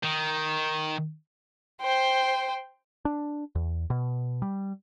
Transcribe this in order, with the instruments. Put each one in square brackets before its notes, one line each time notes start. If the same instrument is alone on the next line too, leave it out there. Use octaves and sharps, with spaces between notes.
[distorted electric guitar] D#3
[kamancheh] C5 G5
[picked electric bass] D4
E2
B2
G3